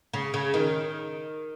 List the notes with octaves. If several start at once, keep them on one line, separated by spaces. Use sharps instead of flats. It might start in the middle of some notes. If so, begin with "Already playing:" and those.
C#3
C#3
D#3